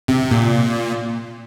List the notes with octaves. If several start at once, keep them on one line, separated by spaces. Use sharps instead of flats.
C3
A#2